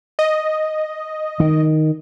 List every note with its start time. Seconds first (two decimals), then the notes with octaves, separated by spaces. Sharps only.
0.19 D#5
1.40 D#3